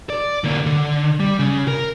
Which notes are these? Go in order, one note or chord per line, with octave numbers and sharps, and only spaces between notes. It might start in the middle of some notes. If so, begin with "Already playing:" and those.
D5
D3 A#3
D3
G3
C#3
A#4